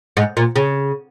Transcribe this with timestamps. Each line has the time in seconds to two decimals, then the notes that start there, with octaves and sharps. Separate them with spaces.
0.17 G#2
0.37 A#2
0.56 C#3